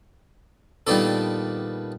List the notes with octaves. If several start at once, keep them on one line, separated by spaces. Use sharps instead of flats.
A#2 D#3 G3 B3 D4 A4